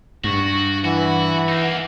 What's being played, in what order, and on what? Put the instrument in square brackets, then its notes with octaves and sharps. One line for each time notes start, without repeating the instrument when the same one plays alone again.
[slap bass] G2 [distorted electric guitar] F#4 [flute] C#6
[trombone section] E3 [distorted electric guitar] F#4 [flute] F#5
[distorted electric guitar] A#3 D#4